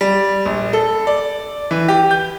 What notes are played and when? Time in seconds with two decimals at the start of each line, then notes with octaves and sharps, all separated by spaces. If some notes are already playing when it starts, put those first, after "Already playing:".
0.01 G3
0.46 A#1
0.73 A4
1.07 D5
1.71 E3
1.88 G4
2.11 G6